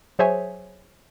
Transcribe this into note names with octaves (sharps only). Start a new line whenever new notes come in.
F#3 G#4 C5 C#5 E5 G#5